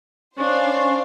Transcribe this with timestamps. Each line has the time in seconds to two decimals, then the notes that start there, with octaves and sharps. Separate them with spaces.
0.38 C#4 D4 C5 F5 C#6